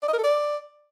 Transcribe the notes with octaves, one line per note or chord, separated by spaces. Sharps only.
D5
D#5
A#4
A4
D5